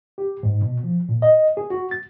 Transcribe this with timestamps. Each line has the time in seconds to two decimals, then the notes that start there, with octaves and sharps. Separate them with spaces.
0.18 G4
0.43 G#2
0.62 B2
0.84 F3
1.09 A#2
1.22 D#5
1.57 G#4
1.70 F#4
1.91 A6